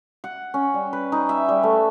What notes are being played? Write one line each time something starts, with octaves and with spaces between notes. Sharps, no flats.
F#5
C#4
G3
B4
D#4
E5
G3
A3